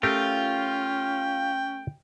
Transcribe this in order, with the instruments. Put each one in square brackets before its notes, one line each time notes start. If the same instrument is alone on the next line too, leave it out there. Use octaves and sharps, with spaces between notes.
[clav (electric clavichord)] A3 G4 A#4 [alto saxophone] C#4 [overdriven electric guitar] F4 [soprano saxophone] G5